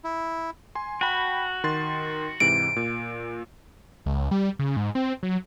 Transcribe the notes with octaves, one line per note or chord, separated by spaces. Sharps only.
E4
G#5 C6
F#4 G5 A5 B5
D#3 C6 A6
G#2 C3 E3 D7
A#2
C#2
G3
C#3
G#2
C4
F#3